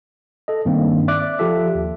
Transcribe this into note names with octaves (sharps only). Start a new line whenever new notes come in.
A4 D#5
G2 D#3 A#3 C4
D5 E5 D6 F#6
F3 F4 G4 A4 E5
D#2